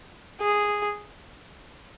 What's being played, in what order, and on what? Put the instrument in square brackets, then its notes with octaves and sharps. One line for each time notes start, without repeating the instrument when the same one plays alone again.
[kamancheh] G#4